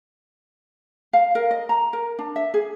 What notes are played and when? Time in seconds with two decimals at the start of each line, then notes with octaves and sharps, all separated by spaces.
1.13 F5
1.35 A#4
1.51 D#5
1.69 A#5
1.93 A#4
2.19 D4
2.36 E5
2.54 G#4